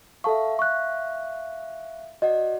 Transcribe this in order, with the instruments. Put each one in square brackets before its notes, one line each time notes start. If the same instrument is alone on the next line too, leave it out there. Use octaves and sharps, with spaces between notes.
[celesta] A4 A5 C#6 [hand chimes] E5 F5
[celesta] C#6 F#6
[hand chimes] F#4 D5 F#5 [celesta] D#5